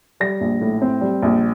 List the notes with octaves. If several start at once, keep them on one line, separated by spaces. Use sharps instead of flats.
G3 A#6
A#1
A2
C4
G3
A#1